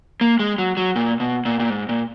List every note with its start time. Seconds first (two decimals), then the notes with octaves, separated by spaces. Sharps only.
0.21 A#3
0.39 G#3
0.58 F#3
0.77 F#3
0.96 A#2
1.20 B2
1.45 A#2
1.60 A#2
1.70 G#2
1.89 A#2